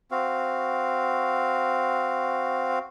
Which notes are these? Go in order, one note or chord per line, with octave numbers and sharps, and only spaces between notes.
C4 F#4 F5